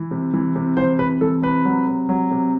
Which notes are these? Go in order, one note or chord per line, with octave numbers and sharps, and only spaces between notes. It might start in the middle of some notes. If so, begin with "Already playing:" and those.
Already playing: E3
C3
E3
C3
E3 C5
C3 B4
E3 A4
C3 B4
F#3
C3
F#3
C3